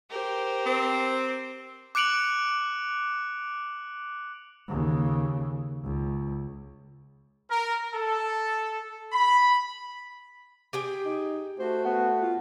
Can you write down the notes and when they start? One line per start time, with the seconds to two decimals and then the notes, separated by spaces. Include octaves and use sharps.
0.10 G4 A#4 C5
0.66 C4
1.95 D6 F#6 C#7 D7 F7 F#7
4.68 D#2 C#3
5.84 C#2
7.49 A#4
7.93 A4
9.13 B5
10.73 G4 G#4 G5
11.05 D#4
11.59 A3 F#4 C5
11.85 B3 F#5
12.21 F4